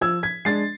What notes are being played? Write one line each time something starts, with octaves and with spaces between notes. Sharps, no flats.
F3 E6 G#6
G#6 B6
G#3 D4 A6 C7